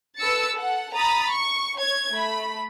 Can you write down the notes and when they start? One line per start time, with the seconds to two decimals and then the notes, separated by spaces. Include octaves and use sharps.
0.19 A4 B4 E6 A6 C#7
0.55 A4 F#5
0.94 A#5 B5 D#6 A6
1.31 C#6
1.79 C#5 G#6
2.13 A3 B5